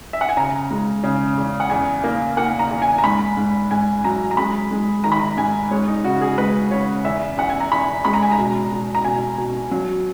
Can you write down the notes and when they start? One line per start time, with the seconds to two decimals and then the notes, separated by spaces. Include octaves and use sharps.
0.13 E5
0.21 F#5
0.29 G#5
0.37 C#3 A#5
0.71 G#3
1.03 C#3
1.37 E2
1.60 F#5
1.70 E2 G#5
2.04 A#3
2.37 A#3 F#5
2.59 A#5
2.71 E2
2.82 G#5
2.98 A#5
3.04 G#2 B5
3.37 G#2
3.71 G#2 G#5
4.04 F#3 A#5
4.31 A#5
4.37 G#3 B5
4.71 G#3
5.04 D#3 A#5
5.12 B5
5.20 A#5
5.37 G#2 G#5
5.71 G#3 C#5
5.88 D#4
6.04 C#3 F#4
6.21 G#4
6.38 G#3 B4
6.71 C#3 C#5
7.05 E2 E5
7.37 E2 F#5
7.50 G#5
7.60 A#5
7.71 E2 B5
8.05 G#3 B5
8.14 A#5
8.23 G#5
8.31 A#5
8.38 B2
8.72 B2
8.95 A#5
9.05 B2 G#5
9.38 B2
9.71 F#3